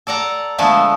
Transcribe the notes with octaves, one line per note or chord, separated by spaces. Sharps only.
A4 D5 F#5 A#5
D3 F3 G#3 A3 B3